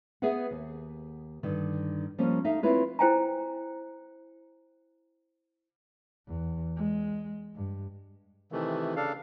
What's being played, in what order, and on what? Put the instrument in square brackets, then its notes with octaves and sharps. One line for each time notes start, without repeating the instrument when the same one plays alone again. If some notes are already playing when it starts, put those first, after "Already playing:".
[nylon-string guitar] B3 G#4 B4 E5 F#5
D#2
G2 D3 D#3
F3 G3 A#3 C#4
D#4 A4 E5 F5
C4 E4 F4 B4 C#5
[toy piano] E4 C5 G5 G#5 A#5
[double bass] E2
G#3
G2
[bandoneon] C3 D#3 E3 A3
C#3 D4 A4 F5